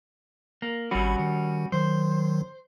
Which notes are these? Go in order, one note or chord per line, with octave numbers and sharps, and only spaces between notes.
A#3
G#1 G3 C#4 F#4 B5
D#3
D#3 F#3 C5